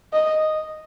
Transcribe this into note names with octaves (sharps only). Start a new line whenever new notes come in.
D#5